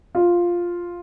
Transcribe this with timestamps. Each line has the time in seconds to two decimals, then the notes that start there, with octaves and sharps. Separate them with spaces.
0.15 F4